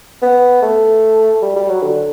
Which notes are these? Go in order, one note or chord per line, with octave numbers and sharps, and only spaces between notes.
B3
A3
G3
G3
F#3
D3